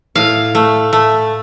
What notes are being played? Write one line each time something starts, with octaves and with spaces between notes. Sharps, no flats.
A2 F5
A3
A3